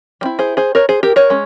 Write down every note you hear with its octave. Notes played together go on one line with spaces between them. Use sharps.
G3 C4 E4
G#4 C5
G#4 C5
A#4 C#5
G#4 C5
G4 A#4
A#4 C#5
G#3 C#4